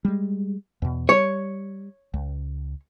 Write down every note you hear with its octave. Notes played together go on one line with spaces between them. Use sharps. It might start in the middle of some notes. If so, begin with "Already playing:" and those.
G3 G#3
E2 B2
G3 C#5
C#2